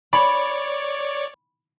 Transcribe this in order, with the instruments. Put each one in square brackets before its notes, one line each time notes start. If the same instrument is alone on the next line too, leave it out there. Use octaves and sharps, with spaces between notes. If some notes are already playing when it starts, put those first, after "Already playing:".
[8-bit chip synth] C#5 D5 [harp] B5